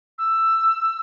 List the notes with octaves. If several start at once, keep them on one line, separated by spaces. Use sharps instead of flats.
E6